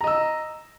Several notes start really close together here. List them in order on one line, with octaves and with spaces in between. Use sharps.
A#5 D#5 E6